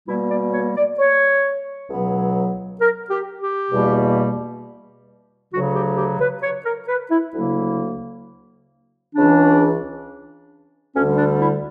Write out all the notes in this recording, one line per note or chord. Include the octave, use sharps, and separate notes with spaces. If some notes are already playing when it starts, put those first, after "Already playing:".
B2 G3 A#3 E4
D5
C#5
D5
C#5
C#2 B2 F#3 B3
A#4
G4
G4
E2 B2 G3 A#3
D2 C#3 F#3 F#4
G4
G4
B4
C#5
A#4
B4
E4
D2 C#3 F#3 A#3 E4
C#2 C#3 E3 D4
D2 D3 G3 C#4
D4
E4